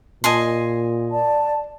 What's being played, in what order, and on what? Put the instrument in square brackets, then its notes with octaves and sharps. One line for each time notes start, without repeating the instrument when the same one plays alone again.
[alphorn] A#2 [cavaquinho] D#5 G#5 C6
[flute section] D5 A5